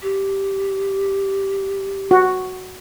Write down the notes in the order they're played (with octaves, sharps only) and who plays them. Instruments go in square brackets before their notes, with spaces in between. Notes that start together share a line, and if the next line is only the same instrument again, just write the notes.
[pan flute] G4
[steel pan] F#4